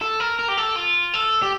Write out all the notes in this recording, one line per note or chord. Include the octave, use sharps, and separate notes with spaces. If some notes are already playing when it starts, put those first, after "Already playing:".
A4
A#4
A#4
G4
A4
F4
A4
G4